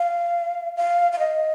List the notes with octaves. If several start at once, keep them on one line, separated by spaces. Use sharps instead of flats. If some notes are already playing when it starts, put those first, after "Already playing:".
Already playing: F5
F5
F5
D#5